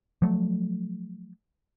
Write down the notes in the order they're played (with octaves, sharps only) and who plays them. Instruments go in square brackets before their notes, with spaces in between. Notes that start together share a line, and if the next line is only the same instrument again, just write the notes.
[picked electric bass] F3 F#3 A3